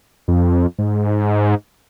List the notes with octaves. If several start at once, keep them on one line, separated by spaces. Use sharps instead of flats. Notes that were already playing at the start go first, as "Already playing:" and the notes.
F2
G#2